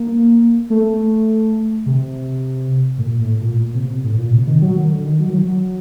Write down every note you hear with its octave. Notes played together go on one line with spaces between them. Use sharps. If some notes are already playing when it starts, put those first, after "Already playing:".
Already playing: A#3
A3
C3
A2
A#2
A2
A#2
A#2
C3
A2
A#2
C3
D#3
F#3
D#3
D3
D#3
F#3
D#3
F#3